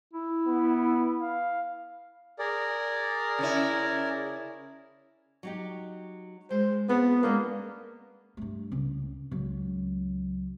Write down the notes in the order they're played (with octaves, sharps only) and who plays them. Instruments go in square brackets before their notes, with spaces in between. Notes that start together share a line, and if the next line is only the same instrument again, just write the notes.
[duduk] E4
[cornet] B3
F5
[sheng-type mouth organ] G#4 A#4 D5
[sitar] C#3 C#4 E4
[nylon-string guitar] F#3 D#4 G4
[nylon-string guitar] G#3 [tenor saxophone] C5
[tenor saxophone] B3 [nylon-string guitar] C4 F4 G#4
[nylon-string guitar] G#3 C#4 D4 [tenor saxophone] A#3
[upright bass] G2 A3
C#2
C#2 F#3